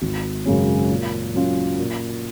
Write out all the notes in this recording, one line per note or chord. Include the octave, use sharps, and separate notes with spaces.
G#1
F#2 C#3 G#3 C#4
A#2
F#3 C#4 F4
A#2